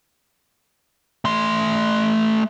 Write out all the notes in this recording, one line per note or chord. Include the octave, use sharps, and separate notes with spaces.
A3 C6